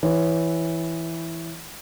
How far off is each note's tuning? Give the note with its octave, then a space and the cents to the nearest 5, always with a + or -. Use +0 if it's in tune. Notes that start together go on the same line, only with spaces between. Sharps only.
E3 +0 C#5 +5